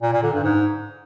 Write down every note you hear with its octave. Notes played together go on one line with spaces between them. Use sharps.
A#2
A#2
D3
G2
G#2